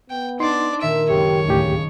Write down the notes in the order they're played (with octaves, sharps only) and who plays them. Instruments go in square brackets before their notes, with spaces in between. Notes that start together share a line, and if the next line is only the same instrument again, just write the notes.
[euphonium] B3 [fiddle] G5
[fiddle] D4 D5 [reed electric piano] D#4 C6
[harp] A#2 D#3 D7 [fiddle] E5
[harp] F#1 F#3 G#3 [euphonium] G4 [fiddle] C#5
[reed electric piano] D2 A2 G4 [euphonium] C#3 [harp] D4 D#5